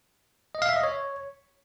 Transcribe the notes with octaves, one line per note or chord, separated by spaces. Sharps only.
D#5
F5
E5
D#5
C#5